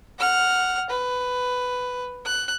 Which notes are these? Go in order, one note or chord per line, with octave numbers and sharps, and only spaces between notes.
F#5 F6
B4
F#6